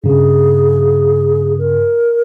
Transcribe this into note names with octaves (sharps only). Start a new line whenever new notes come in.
G2 C#3 G#4
A#4